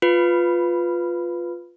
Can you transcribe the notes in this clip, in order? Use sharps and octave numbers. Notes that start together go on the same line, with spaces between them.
F4 B4